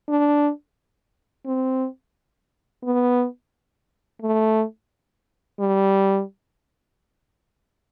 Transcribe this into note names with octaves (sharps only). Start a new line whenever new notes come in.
D4
C4
B3
A3
G3